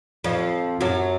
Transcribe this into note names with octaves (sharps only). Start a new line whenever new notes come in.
F2 F3
F#2 F#3